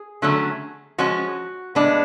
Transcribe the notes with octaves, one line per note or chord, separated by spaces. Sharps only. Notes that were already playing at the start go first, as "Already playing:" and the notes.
Already playing: G#4
D3 F#3 A3 C#4
F3 G#3 C#4 F#4
A2 G#3 B3 D4